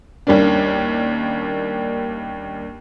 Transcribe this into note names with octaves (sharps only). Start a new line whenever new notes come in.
D#2 G3 A#3 C#4 D4